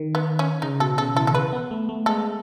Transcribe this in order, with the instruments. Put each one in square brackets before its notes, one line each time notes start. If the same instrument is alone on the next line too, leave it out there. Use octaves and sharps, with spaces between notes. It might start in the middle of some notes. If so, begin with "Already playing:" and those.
Already playing: [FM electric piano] D#3
[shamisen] B3
C#4
[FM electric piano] C#3 [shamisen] D#4
[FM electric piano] B2 [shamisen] A4
[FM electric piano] C#3 [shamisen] A4
[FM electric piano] E3 [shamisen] A4
[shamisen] A4
[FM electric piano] C#3 [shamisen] B4
[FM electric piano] B3
A3
A3
[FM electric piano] G#3 [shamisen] A4